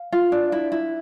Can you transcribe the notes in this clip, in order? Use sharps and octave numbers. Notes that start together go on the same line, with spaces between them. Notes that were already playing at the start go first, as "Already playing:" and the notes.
Already playing: F5
F4
D4
E4
E4